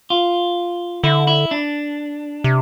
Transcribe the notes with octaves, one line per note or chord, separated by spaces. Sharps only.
F4
D3 E4
E4
D4
C3